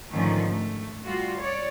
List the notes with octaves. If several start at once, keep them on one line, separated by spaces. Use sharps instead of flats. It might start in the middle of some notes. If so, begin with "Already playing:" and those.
G#2 D3 D#3 F3 A3 C#4
A3
G3 F4 F#4
C#5 D5